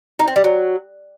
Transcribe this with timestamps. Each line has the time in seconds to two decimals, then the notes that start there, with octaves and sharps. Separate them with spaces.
0.19 D#4
0.28 C4
0.36 G3
0.44 F#3